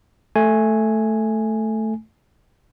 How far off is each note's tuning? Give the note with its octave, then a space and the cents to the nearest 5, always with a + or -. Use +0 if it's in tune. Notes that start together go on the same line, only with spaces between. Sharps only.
A3 +0 G#5 +0